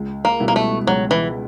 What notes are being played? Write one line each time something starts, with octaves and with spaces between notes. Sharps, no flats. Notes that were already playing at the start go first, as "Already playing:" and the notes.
Already playing: C#2
A#3
B2 G3 B3 E4
A#3
A3
C#2 F#3
E3